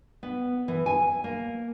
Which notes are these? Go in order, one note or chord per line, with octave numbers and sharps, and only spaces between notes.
B3
E3
G#5
A#3